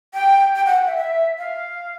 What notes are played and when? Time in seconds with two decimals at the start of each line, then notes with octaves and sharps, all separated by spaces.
0.14 G5
0.55 G5
0.66 F#5
0.87 E5
0.97 E5
1.38 F5